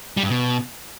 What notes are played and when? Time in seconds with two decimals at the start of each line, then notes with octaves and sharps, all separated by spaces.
0.17 G3
0.23 G2
0.30 B2